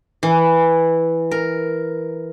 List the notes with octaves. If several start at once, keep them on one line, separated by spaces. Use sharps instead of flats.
E3
A#4